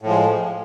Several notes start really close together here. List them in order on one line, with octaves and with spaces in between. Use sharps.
A2 F3 G#3